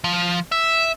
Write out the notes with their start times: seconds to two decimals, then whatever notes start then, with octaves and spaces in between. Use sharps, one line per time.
0.04 F3
0.52 E5